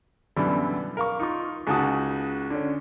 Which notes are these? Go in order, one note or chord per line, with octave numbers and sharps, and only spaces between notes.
F#2 B2 D3 E3 G3
A#4 F5 C#6
D#4 F4 C#6
C#2 C#3 D#4 F#4 A5 D#6
D3 C#4